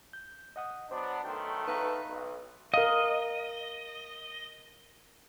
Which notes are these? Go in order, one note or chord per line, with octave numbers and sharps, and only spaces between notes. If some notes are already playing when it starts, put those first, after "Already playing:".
G6
D#5 F#5 D#6
F#3 B3 D4 C5
B1 D#3 A3 G5 C6
D#4 B4 F5 A#5
B1
A#4 D#5 F5